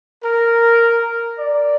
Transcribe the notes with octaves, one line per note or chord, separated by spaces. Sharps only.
A#4
D5